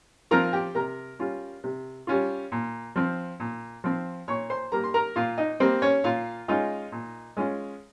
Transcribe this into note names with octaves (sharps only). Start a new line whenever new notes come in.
F3 C4 F4 A#4 A#5
G4 G5
C3 A#4 A#5
G3 C#4 F4
C3
G3 C#4 F4
A#2
F3 C4
A#2
F3 C4
A#2 C#5 C#6
C5 C6
G3 A#3 A#4 A#5
C6
A#4 A#5
A#2 F4 F5
D#4 D#5
G3 A#3 C4 C5
C#4 C#5
A#2 F4 F5
G#3 C#4 D#4 F4 D#5
A#2
G#3 C#4 F4